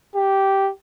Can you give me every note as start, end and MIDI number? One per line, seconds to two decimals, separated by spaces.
0.15 0.71 67